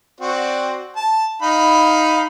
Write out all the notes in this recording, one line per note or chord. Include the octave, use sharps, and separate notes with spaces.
C4 F#4 D5
A5
D#4 F5 B5